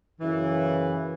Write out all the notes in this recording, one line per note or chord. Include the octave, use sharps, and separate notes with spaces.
F#2 C#3 E3